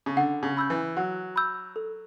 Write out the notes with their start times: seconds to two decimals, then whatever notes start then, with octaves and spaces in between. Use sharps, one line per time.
0.06 C#3
0.17 D3 F#5
0.43 C#3
0.57 B5 E6 G6
0.70 E3
0.96 F#3 F#5
1.36 B5 E6 G6
1.76 A4